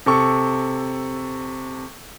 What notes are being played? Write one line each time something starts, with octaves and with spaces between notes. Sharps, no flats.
C3 A4 C#6